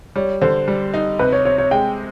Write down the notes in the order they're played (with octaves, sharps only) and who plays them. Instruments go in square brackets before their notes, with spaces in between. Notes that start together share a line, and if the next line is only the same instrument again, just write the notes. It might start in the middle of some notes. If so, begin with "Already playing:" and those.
[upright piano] G3 [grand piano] C#5
[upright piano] D3 [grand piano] C5
[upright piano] G3
D#4
[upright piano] C3 [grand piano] B4
[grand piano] C#5
[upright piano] C4 [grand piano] C#5
[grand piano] C#5
[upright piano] G#3 [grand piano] G5